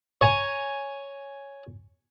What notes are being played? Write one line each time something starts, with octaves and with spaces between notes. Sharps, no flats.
C#5 G#5 A#5